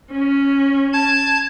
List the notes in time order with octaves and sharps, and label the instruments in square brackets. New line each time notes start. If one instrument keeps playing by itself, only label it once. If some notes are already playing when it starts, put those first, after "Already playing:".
[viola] C#4
[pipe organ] A5 G#6